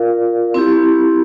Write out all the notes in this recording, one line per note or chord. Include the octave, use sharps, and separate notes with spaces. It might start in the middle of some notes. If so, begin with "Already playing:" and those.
Already playing: F4 A#4 D5 F5
C4 E4 G4